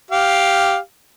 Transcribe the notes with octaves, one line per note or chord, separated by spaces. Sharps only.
G4 F5